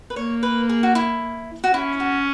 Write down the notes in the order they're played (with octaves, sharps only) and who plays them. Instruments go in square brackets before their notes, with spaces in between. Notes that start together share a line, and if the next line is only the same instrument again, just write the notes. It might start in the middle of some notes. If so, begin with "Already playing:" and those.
[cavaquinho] B4
[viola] A#3 [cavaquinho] C#5
[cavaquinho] B4
G#4
F#4
E4
F#4
[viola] C#4 [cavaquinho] E4
[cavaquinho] F#4